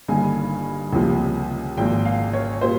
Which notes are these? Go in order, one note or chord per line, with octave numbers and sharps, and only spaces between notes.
G1 G2 D#3 A#3 G#5
C#2 C3 F3 A#3
G#1 G#2 F3 A#3 G5
F5
C#5
A#2 G3 C5